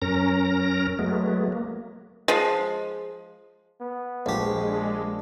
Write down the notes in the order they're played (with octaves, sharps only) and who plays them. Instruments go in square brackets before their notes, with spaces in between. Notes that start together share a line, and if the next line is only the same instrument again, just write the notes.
[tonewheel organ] F#2 C#4 A#4 A#5 A#6
F#3 G#3 A3 B3
A#3
[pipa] F3 G#3
[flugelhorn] B3
[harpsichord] A#1 G4 [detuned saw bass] G#3
[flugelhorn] D4